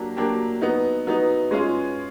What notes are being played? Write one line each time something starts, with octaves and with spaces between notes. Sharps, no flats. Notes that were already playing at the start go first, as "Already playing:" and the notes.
Already playing: F#3 A#3 D4 G4
F#3 A#3 D4 G4
F#3 B3 D#4
F#3 B3 D#4
G#3 C#4 F4 G#4